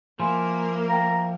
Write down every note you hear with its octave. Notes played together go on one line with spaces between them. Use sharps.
F3 A#3 E4 A#4 G#5 B5 C6
F5 G5 A#5